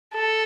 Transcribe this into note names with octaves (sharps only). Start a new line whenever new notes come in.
A4